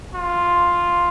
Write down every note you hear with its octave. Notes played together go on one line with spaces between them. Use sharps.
F4